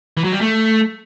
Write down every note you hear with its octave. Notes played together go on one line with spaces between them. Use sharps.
E3
F#3
G3
A3